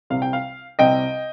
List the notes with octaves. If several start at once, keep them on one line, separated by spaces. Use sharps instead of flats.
C2 C3 G3 C4 F5
G5
F5
C2 C3 G3 C4 D#5 G5